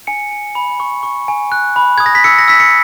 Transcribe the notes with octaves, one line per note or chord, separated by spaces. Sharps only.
G#5 C#7
G#5
B5
C#6
C#6
G#5
F#6
B5
D#6 G#6
A#6
B6
E6 C#7
A#6
E6 B6
C#7